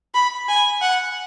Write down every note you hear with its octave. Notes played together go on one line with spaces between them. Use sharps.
B5
G#5
F#5